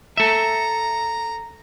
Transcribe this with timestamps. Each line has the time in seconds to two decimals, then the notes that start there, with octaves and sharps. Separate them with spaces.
0.17 A4 E5 A#5